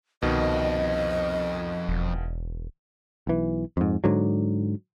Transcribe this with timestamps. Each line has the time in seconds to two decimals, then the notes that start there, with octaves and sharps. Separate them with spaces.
0.22 C2 F2 B2 D#3 D#5
1.88 E1
3.27 B1 E3
3.77 F2 G#2
4.04 G#2 D3 F#3